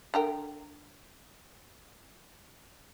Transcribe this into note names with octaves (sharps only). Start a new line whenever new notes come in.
D3 A#4 G5